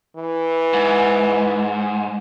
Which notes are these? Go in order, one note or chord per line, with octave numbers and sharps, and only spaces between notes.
E3
G#2